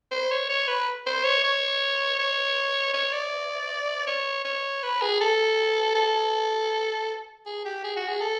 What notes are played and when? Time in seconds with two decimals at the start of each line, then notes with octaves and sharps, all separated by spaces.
0.11 C5
0.31 C#5
0.49 C#5
0.68 B4
1.06 C5
1.24 C#5
1.44 C#5
2.19 C#5
2.93 C#5
3.13 D5
4.07 C#5
4.45 C#5
4.83 B4
5.01 G#4
5.21 A4
5.95 A4
7.46 G#4
7.65 G4
7.84 G#4
7.96 F#4
8.08 G#4
8.21 A4